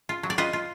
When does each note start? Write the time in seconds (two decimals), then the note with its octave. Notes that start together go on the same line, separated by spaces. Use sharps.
0.09 F4
0.23 F#3
0.30 D5
0.38 F4 B4 D#5
0.53 F4